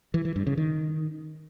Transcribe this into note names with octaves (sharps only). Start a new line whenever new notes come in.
E3
E3
G2
C#3
D#3